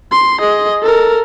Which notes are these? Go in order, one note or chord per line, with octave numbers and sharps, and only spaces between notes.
C6
G#4 D#5
A4 A#4